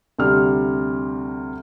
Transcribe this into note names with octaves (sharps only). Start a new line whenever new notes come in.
D2 C3 G3 F6